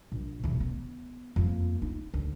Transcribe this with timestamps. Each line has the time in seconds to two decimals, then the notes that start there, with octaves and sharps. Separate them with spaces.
0.12 A#1
0.44 E1 E2
0.60 B3
1.36 F2 A#3
1.82 D#4
2.14 D2